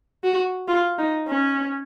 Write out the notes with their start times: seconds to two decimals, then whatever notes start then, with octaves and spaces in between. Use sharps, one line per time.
0.24 F#4
0.68 F4
0.98 D#4
1.28 C#4